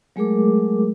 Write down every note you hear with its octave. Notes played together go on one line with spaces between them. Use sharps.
F#3 G#3 A3 G#4 A#4 D6